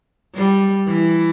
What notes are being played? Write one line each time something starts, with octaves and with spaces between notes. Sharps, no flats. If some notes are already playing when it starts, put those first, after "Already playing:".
G3
E3